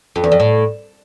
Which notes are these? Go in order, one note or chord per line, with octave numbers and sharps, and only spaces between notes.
F2
E2
F2
A2